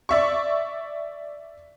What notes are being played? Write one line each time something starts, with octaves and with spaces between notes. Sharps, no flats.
D5 E5 C#6